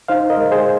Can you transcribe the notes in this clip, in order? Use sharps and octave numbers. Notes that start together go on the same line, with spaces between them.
D#4 C5 F5
A#4 D#5
G#3
G#4 C5